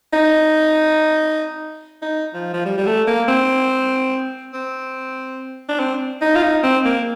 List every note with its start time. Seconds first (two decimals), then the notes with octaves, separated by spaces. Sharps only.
0.13 D#4
2.02 D#4
2.34 F3
2.53 F3
2.65 G3
2.77 G3
2.86 A3
3.07 A#3
3.28 C4
4.53 C4
5.69 D4
5.80 C4
6.21 D#4
6.36 F4
6.43 D#4
6.63 C4
6.85 A#3